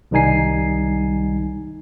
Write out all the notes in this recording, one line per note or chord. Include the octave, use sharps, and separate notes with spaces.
C2 D#3 G3 D#4 G#5 C7